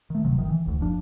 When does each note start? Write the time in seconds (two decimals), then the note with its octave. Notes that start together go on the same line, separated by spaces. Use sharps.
0.10 D#3 A3
0.24 D1 C3 F#3
0.37 G1 D#3
0.50 E3
0.66 F1 D2
0.79 F#1 F3 D4